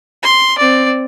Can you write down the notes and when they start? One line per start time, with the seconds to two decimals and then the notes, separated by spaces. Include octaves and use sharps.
0.23 C6
0.58 C4 D5